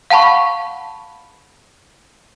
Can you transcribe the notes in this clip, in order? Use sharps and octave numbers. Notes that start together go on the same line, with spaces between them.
F5 F#5 A5 B5 C#6